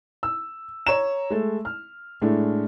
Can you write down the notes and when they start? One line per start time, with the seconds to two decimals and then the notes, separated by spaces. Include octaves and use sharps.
0.23 E6
0.87 C#5 A#5 E7
1.30 G#3 A3
1.65 F6
2.22 A2 G#3 A3 D4